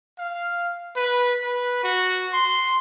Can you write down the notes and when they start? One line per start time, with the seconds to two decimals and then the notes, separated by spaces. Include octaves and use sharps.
0.19 F5
0.96 B4
1.43 B4
1.84 F#4
2.33 C6